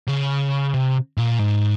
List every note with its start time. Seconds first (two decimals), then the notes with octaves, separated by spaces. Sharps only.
0.08 C#3
0.74 C3
1.18 A#2
1.39 G#2